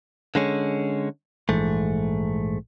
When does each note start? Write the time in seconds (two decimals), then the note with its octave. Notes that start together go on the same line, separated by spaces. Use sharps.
0.35 D3 G#3 C#4
1.49 A#1 G#2 E3 A3